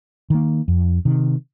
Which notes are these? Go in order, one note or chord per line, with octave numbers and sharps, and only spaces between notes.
D#3 A#3
F2
C3 D#3